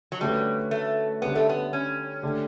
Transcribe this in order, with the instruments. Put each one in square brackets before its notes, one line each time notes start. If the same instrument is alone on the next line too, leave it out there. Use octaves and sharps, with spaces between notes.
[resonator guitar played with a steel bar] F#3
[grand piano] D3 A3 C#4 F#4 B4 [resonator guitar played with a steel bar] G3
[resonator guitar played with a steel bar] A3
[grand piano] D3 G3 C#4 G4 [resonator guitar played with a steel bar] B3
[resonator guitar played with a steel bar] A3
B3
C#4
[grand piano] D3 A3 D4 G4